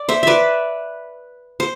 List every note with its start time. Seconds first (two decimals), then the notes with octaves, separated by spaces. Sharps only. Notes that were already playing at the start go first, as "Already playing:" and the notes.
Already playing: D5
0.09 C5 E5
0.23 B4 D5 E5
1.60 C5